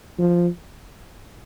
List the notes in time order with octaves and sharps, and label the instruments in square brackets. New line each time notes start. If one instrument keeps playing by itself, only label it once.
[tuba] F3